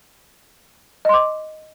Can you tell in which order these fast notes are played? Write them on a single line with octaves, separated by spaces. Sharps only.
D#5 C6 D6